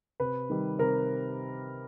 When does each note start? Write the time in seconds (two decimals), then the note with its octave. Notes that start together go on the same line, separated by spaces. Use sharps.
0.20 C3 B4
0.50 D#3 G3
0.79 C3 A#4